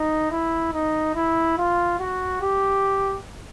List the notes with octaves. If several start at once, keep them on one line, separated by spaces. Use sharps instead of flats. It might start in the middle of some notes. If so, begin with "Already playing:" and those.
Already playing: D#4
E4
D#4
E4
F4
F#4
G4